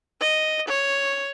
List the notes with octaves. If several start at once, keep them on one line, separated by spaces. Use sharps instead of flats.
D#5
C#5